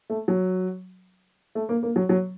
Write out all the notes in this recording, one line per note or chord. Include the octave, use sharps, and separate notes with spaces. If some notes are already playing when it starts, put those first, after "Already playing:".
A3
F#3
A3
A#3
A#3
F#3
F#3